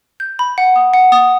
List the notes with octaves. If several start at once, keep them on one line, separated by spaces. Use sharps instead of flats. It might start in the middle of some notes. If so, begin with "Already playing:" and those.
G6
B5
F#5
D#6
F#5
D#6